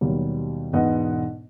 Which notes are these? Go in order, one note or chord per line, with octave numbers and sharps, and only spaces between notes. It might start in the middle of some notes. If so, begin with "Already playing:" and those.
D#2 B2 F#3 G3
E1 G#2 B2 B4 D#5 F#5